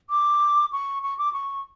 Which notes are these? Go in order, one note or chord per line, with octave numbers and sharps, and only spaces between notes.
D6
C#6
C#6
D6
C#6